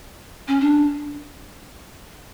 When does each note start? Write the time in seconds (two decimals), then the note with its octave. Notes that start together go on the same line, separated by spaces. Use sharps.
0.48 C#4
0.60 D4